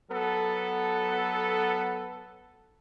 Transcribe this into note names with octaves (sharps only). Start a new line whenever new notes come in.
F#3 B3 A4